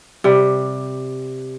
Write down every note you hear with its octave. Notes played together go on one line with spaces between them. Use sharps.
C3 G3